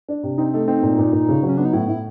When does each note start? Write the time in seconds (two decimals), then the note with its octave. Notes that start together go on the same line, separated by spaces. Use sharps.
0.09 D4
0.23 C3
0.38 C4 D#4
0.53 A3 D#4
0.68 C4 D#4
0.83 A#2
0.98 A#2
1.13 A#2
1.29 C#3
1.43 F#3
1.48 C#4
1.57 B3 D4
1.65 D#4
1.73 A2 E4
1.88 A2 E4